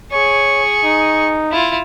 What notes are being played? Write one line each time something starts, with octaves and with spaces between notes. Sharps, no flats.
G#4 C#5 C#6
D#4
E4 F4